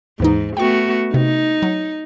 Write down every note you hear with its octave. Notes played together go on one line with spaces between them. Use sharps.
D#2 G#2 E3 D#4
A3 B3 F#4 G5 C#6
C3 D#4
F#3